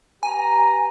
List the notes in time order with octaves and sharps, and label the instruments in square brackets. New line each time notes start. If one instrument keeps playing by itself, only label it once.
[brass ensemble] G4 B4 A#5 [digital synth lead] G#5